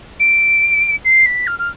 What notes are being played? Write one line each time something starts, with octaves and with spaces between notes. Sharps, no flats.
D7
C7
B6
F6
F6